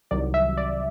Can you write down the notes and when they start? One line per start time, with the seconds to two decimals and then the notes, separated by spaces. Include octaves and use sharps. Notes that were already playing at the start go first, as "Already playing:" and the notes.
0.11 C2 C3 D#3 F#3 D5
0.34 E5
0.57 D5